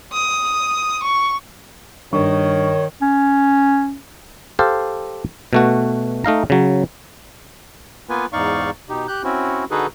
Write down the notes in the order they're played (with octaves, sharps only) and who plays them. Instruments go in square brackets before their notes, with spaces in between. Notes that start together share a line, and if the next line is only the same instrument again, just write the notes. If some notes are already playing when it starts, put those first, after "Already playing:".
[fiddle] D#6
C#6
[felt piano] G2 C#6 [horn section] D#3 [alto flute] C#5
[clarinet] C#4
[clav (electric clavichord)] G4 A4 C5 F5
B2 A3 F#4
A3 D#4 F5 A#5
C#3 F#3
[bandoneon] A#3 B3 F4 B4 G#5
E2 G#2 D#4 D5 F5 C#6
B2 D#4 G4
G4 F#6 G6
C4 C#4 E4 F#4
D3 D#4 F#4 G#4 A4 B4